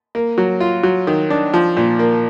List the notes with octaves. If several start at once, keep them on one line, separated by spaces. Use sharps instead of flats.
A#3
F#3
F4
F#3
D#3
D4
F3
A#2
A#3